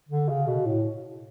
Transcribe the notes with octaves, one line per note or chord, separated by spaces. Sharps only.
D3
C#3
B2
A2